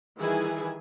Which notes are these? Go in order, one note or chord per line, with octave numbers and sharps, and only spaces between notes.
D#3 E3 G3 E4 G#4 G#5